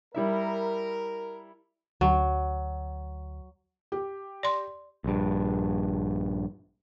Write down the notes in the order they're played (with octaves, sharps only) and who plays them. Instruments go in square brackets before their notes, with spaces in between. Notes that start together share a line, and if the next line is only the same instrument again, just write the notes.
[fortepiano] G3 E4 E5 [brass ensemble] A#4
[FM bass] D2 [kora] F#3
[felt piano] G4
[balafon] D5 C6
[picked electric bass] A#1 G2